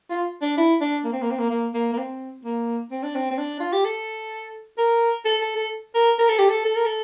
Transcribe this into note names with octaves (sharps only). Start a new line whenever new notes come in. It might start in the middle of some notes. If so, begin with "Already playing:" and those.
F4
D4
E4
D4
A#3
C4
A#3
C4
A#3
A#3
A#3
A#3
C4
A#3
C4
D4
C4
C4
D4
F4
G4
A4
A#4
A4
A4
A4
A#4
A#4
A4
G4
A4
A4
A#4
A4